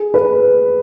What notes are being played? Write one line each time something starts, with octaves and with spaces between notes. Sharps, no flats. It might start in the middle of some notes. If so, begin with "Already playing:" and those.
Already playing: G#4
B4